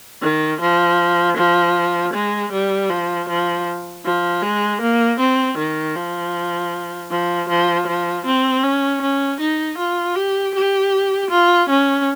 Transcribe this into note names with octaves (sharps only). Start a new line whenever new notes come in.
D#3
F3
F3
G#3
G3
F3
F3
F3
G#3
A#3
C4
D#3
F3
F3
F3
F3
C4
C#4
C#4
D#4
F4
G4
G4
F4
C#4